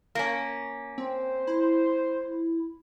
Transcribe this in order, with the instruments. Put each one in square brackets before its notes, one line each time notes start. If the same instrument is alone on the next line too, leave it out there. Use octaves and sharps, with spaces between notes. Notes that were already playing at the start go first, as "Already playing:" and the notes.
[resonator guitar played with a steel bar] A#3 C#4
[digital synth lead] C4 [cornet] C5
[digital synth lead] E4